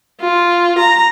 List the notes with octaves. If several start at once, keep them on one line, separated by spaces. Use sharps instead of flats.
F4
A#5